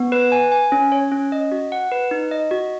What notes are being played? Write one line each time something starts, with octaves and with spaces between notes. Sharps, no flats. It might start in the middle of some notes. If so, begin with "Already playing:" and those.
Already playing: B3
B4
G#5
G#5
C#4
C#5
C#4
D#5
F#4
F#5
B4
D#4
D#5
F#4